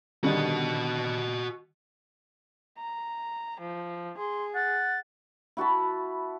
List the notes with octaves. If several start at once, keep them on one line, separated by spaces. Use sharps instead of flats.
D3 D#3 G3 F#4 D#5
A#5
F3
G#4 C6
F#5 A6
E4 F#4 A5 B5